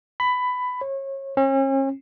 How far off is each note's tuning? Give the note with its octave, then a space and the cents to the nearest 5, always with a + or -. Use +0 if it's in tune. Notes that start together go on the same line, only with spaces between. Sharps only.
B5 +15
C#5 -30
C#4 -40